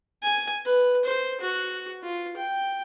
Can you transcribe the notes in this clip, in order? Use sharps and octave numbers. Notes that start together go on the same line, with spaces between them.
G#5
B4
C5
F#4
F4
G5